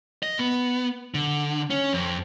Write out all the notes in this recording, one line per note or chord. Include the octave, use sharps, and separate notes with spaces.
D#5
B3
D3
C#4
F2